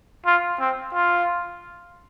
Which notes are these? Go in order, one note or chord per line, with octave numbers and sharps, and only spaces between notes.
F4
C4
F4